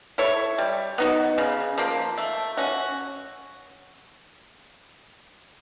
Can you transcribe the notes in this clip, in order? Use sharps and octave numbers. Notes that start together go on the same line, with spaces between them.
E4 A4 C#5
G3
B3 D#4 F#4
C#3
F3 A#3
A3
C#4 F#4